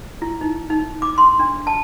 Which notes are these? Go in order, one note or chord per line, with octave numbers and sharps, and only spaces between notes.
E4
D#4
D#4
D6
C6
D4
A5